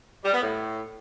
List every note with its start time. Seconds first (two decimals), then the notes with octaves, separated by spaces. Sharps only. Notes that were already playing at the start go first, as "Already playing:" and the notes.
0.24 G3
0.33 B3
0.42 A2